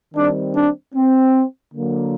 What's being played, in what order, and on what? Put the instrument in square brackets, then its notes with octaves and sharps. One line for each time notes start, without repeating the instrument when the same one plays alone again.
[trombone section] D#3 G3 C4 D4
D4
C4
D3 F#3 A#3